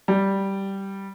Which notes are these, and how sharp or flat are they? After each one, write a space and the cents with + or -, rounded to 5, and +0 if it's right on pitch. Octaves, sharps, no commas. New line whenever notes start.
G3 -5